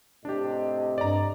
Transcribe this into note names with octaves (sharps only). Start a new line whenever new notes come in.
A2 C3 D4 G4 D#5
G2 D5 A#5